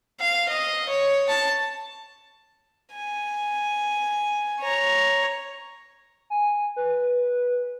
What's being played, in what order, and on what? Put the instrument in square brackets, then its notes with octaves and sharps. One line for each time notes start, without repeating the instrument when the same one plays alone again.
[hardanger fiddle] F5
D#5
C#5
A5
G#5
C#5 A#5
[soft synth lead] G#5
B4